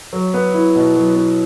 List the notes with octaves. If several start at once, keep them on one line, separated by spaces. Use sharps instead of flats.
F#3
B3
E4
B2
F#3
B3